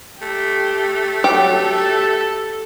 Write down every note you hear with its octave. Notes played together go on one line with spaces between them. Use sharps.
A3 G4
F#3 G4
A4